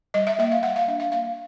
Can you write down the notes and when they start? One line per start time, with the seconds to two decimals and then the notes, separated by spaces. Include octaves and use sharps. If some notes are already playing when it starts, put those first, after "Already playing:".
0.14 G3 D#5
0.27 E5
0.39 A#3 E5
0.52 F5
0.63 G3 F#5
0.76 F5
0.88 D4 E5
1.00 F5
1.12 A#3 F5